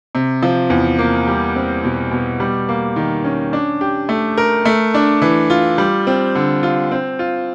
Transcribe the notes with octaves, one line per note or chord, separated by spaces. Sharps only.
C3
F3
E2
A#3
G3
C4
B2
B2
G3
A#3
D#3
C#4
D4
G4
A3
A#4
A3
D4
E3
F4
G3
C4
D3
F4
C4
F4